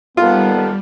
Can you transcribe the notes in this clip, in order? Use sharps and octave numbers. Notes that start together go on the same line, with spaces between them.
D#2 D#3 G3 B3 F4 A4